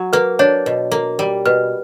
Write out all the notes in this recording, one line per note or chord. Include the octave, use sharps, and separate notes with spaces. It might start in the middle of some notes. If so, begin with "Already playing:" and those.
Already playing: F#3
A#3 B4
D4 C#5
B2
A#3
G3
B2 B4